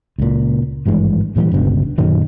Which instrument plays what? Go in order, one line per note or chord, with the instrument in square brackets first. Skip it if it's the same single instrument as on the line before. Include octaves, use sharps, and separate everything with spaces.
[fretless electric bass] C#2 A#2
G#1 G2 E3 G#3
A#2 E3 F3 G3
G1 C#2 G2 B2
F#2 A#2 D#3 F#3